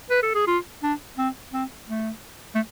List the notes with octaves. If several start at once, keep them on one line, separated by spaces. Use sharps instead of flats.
B4
A4
G#4
F4
D4
C4
C4
A3
A3